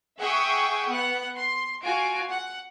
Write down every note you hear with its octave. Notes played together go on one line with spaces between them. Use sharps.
G#4 E5 F#5 G5 C#6 D#6
B3 F#5
C6
F4 F#4 G#5 D7
F#5